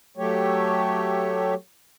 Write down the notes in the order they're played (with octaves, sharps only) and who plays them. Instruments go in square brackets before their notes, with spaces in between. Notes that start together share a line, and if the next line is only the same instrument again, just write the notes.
[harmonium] F#3 A3 G4 C#5